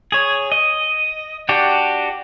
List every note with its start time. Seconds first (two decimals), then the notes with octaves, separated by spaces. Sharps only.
0.12 G#4 C#5
0.52 D#5
1.49 D4 F#4 G4